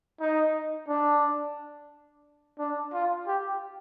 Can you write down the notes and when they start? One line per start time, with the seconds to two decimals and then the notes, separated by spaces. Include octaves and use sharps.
0.21 D#4
0.88 D4
2.59 D4
2.93 F4
3.27 G4